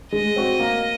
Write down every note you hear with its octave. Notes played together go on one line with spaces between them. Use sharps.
G#3 D#5
C4 F#4
A#3